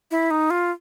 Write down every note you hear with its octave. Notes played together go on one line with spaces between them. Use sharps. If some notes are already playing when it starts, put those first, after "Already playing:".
E4
D#4
F4